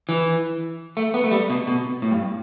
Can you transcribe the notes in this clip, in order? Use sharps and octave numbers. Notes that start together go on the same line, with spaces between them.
E3
A3
B3
A3
G3
B2
B2
A2
G2